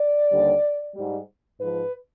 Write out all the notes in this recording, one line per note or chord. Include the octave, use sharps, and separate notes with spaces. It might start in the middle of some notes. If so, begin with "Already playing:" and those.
Already playing: D5
D#2 D3 G3
G#2 G3
G#2 F3 B4